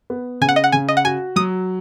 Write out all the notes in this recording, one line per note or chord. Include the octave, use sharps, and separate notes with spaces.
B3
C#3 G#5
F#5
D#5
F#5
C#3 G#5
D#5
F#5
F#4 G#5
F#3 D#6